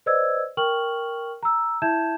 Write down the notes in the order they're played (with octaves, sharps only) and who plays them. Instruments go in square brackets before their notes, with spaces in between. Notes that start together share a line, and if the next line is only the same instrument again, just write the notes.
[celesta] B4 C5 D5 D#5 E6 G#6
A#4 G5 C#6 F6 F#7
A#5 E6
E4 E5 A5 G6 G#6 E7